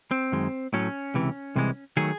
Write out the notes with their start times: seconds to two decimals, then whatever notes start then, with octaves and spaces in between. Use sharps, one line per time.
0.11 C4
0.32 F#2 D#3 G#3
0.73 A2 F#3 A3 C#4
1.14 C#2 C3 E3
1.56 C2 C3 E3 G#3
1.97 D#3 F#3 A3 G#4